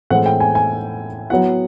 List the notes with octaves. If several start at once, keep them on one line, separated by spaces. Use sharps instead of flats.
A2 E3 G#3 C4 F#5
G5
G#5
G#5
F#3 B3 E4 F#5